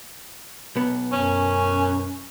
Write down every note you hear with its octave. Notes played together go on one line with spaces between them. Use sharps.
B1 B3
F#2 C#4